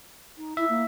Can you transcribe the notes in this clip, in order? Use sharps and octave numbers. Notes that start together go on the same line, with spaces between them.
D#4
E4 E5
A#3